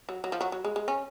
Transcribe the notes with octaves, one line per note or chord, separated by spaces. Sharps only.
F#3
F#3
F3
F#3
F#3
G#3
G#3
C#4